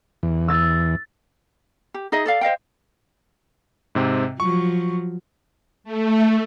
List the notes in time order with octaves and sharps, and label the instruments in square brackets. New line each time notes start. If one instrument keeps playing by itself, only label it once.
[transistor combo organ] E2
[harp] E6 A6
[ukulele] G4
D#4 G#4 D#5 E5
A4 D5 F5
C5 D#5 F5 G5
[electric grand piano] G#2 C3 C4
[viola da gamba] F3 F#3 [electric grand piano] C#6
[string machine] A3